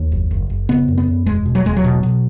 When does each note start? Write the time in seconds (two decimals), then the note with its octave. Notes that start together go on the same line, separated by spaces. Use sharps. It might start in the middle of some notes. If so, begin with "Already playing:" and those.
Already playing: D#2
0.12 F#1
0.31 F#1
0.50 F#1
0.69 C#3 B3
0.88 F#2
0.98 B3
1.08 F#2
1.26 E1 G#3
1.46 B2
1.55 F#3
1.65 E1 G#3
1.77 F#3
1.84 B2
2.03 B2